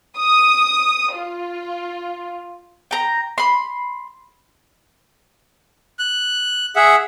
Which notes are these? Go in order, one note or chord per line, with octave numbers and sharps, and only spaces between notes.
D#6
F4
G5 A#5
B5 C6
F#6
G#4 E5 F#5